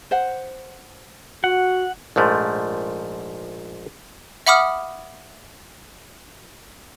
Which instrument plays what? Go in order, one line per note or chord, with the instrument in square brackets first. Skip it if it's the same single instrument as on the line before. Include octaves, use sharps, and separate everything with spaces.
[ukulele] C5 F#5
[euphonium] F#4 [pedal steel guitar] F#5
[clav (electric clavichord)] A#1 G#2 F3 A3
[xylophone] E5 F#5 B5 D6 D#6 F6